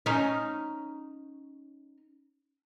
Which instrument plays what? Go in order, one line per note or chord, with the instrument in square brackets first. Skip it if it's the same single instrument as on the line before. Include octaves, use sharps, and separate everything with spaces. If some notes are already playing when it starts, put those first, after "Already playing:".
[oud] C#4 D#4